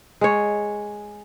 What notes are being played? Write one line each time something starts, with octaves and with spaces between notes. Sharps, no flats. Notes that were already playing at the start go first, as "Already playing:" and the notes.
G#3 C#5